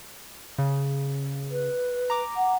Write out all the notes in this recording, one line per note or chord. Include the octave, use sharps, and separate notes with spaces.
C#3
B4
A#5 D6
F#5